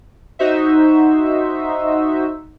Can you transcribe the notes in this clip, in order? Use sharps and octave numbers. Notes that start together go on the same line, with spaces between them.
D#4 F#4 C5 E5